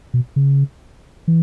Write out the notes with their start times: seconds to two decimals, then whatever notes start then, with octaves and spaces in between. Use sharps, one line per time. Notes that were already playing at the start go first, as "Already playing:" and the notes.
0.14 B2
0.36 C#3
1.28 E3